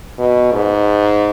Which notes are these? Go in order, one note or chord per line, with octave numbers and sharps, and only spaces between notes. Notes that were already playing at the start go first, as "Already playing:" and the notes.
B2
G#2